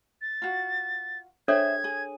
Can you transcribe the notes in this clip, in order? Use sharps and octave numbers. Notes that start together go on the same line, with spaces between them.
A6
F4 F#4
D4 G#4 A4 C5 C#5 E5 G#6
G#4